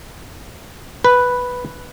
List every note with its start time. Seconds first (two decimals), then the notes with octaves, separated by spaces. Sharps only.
1.04 B4